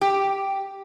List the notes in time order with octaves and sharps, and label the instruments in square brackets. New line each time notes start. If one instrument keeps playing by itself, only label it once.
[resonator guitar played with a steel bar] G4